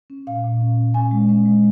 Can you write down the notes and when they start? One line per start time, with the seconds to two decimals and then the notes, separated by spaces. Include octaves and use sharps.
0.10 C#4
0.27 A#2 F5
0.44 A#2
0.61 C#4
0.77 C#4
0.94 C#4 G#5
1.11 G#3
1.29 C#4
1.46 G#3